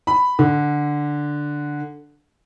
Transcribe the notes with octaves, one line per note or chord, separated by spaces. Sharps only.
B5
D3